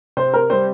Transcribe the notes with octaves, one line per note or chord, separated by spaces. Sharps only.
C3 C5
A#4
G3 C4 C5